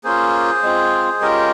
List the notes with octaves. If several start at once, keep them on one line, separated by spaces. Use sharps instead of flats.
A#3 C#4 F4 G#4 C5
G#3 C4 F4
G#3 C#4 F4 G4 A#4